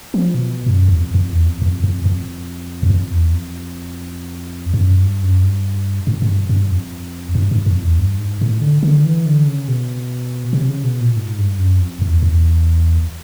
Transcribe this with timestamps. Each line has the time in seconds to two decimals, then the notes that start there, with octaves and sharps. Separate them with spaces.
0.14 F3
0.35 B2
0.66 F#2
0.88 E2
0.98 F2
1.14 F2
1.31 E2
1.47 F2
1.62 F2
1.84 F2
2.05 F2
2.83 F#2
2.90 F2
3.11 E2
3.32 F2
4.74 G2
4.80 F#2
5.01 G2
5.23 F#2
5.43 G2
6.07 G#2
6.22 G#2
6.29 G2
6.49 G2
6.71 F2
7.35 G2
7.51 G#2
7.66 F2
7.82 E2
7.98 G2
8.19 G#2
8.41 A2
8.61 D3
8.83 D3
9.05 E3
9.26 D3
9.47 C#3
9.68 B2
10.53 C3
10.69 C#3
10.84 B2
11.01 A#2
11.17 G#2
11.38 G2
11.58 F#2
11.79 F2
12.02 E2
12.22 E2